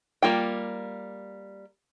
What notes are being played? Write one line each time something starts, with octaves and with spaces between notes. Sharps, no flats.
G3 A#3 F4 G5